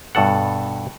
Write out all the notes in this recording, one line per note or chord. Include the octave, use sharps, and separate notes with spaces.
G2 B2 A4 F#5